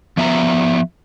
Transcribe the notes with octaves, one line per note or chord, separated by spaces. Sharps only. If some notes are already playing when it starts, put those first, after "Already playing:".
F3 B3 E5 G#5 A#5